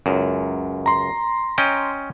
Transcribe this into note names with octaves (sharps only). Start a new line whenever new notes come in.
C#2 F#2
A#5 C6
C#4 D#5 G5